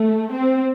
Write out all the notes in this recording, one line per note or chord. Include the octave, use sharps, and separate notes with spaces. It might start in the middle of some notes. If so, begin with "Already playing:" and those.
Already playing: A3
C4